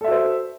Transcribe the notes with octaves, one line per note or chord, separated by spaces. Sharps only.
F#4 A4 C5 E5